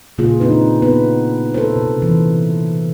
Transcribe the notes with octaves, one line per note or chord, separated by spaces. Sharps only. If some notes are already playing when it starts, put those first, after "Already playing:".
A#2 C#3 A#3 F4 G#4
C4 D4 D#4 B4
B3 B4
A4 B4 C5
C3
E3